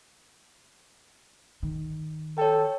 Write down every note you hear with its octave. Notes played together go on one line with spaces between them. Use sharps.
D#3
A4 C#5 G5